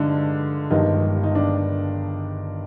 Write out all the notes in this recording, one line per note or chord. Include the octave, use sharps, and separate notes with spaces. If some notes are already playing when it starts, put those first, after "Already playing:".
Already playing: G2 D3 G#3 D4 D#4
G1 G2 D#3 G#3 D#4
D#4
D4